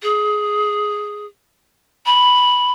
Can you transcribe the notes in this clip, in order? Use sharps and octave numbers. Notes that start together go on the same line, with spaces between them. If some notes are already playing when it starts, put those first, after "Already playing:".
G#4
B5